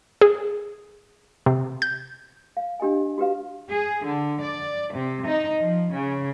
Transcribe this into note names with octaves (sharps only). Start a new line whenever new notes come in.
G#4
C3
G6
F5
D4 G4 D#5 G#5
F#4 G4 B4 F5
G#4
D3
D5
C3
D#4
F3
C#3